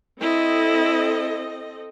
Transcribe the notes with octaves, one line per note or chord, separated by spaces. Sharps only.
C4 E4 A4 D#5